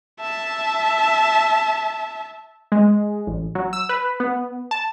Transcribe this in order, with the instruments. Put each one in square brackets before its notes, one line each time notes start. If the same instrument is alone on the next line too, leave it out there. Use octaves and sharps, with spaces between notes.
[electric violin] E5 A5
[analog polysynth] G#3
A1
F#3
E6
B4
B3
A5